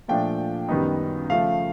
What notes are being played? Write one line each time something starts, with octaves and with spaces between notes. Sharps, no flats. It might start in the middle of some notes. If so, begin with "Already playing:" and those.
A#2 F3 A3 D4 G5
F#2 D#3 G3 B3 D#4
C#3 F3 A3 F5